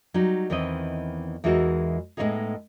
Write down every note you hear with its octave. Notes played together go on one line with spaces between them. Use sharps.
F#3 G3 D#4
E2 D#3 E3 C4 D#5
E2 E3 G#3 D#4 F#4 A#4
A2 G#3 A#3 B3 D#4 G#4